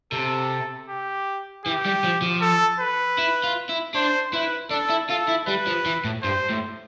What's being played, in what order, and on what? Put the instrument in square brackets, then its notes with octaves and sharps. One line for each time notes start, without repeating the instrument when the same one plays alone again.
[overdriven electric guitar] C3 [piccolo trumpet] A4
[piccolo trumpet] G4
[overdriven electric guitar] E3 [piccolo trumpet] G4
[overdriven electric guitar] G3
F3
F3
[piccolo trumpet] A4
B4
[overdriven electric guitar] E4
F4
E4
[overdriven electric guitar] D4 [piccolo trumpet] C5
[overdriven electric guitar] E4 [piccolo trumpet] B4
[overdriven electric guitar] D4 [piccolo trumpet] A4
[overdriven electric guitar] E4
[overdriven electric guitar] F4 [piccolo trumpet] A4
[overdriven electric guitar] E4
[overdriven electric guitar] G3 [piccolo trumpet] B4
[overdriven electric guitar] F3
E3
A2
[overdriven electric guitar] G2 [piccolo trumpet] C5
[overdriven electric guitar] A2